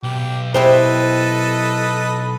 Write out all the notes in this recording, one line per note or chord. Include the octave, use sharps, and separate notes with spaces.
B1 G4
E4 G4 A4 B4 C5 D#5